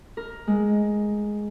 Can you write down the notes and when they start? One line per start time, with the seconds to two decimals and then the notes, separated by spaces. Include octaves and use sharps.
0.17 A#4
0.47 G#3